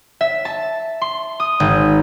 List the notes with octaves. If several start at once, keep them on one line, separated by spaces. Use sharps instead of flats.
E5
A5
C6
D#6
G#1